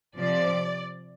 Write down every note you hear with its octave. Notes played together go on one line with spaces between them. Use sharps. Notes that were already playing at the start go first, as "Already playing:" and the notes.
C3 F3 D5